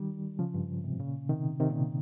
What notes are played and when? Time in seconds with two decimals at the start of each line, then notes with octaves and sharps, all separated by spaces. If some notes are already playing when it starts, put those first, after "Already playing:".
Already playing: D#3 G3
0.39 C#3 F3
0.54 G2
0.84 G#2 C3
0.99 A#2 C#3
1.29 C3 D#3
1.60 C3 D#3
1.70 A#2 C#3